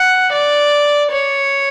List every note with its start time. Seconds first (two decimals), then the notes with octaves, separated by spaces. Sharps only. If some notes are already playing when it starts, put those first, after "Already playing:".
Already playing: F#5
0.33 D5
1.11 C#5